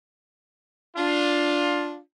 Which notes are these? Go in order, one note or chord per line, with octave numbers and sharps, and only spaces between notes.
D4 F4